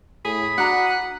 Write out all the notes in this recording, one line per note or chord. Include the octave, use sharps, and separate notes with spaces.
A2 G#4 B5 D#6
D4 F#4 F#5 A#5